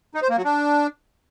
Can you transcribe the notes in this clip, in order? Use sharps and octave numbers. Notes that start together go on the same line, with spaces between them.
D#4
C5
A#3
F#3
D4